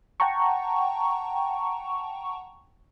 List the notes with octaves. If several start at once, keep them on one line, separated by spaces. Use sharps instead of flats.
F#5 G5 A5 A#5 C#6